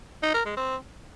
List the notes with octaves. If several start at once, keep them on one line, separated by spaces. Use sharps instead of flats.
D#4
A#4
G#3
C4